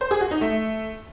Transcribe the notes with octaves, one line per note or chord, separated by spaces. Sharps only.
C5
G#4
F#4
D#4
A3